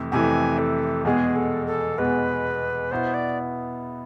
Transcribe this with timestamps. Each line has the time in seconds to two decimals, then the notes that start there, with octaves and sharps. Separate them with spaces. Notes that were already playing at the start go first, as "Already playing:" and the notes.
Already playing: F2 C3 E3 A3
0.12 F2 C3 E3 A3 G#5
0.58 A4
1.05 E2 B2 G#3 G#4
1.36 A4
1.67 A4
1.98 E2 B2 G#3 B4
2.91 B2 B3 E4 C5
3.14 D5